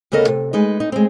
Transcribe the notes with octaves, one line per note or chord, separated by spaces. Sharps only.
D2 C#3 B3 A4 A#4 D#5
C3
G#3 D#4 B4
D#4
G#3 C4